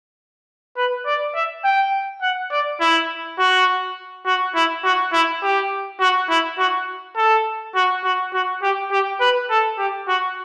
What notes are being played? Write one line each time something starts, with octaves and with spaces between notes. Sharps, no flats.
B4
D5
E5
G5
F#5
D5
E4
F#4
F#4
E4
F#4
E4
G4
F#4
E4
F#4
A4
F#4
F#4
F#4
G4
G4
B4
A4
G4
F#4